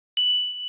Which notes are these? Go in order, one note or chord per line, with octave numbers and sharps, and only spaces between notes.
F#7